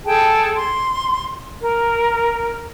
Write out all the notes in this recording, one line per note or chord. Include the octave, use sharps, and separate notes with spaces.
G#4 A4 G5 A5
C6
A#4